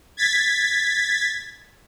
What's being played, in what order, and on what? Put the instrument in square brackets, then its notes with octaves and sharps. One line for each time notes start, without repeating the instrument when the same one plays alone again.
[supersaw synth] G#6 A6 B6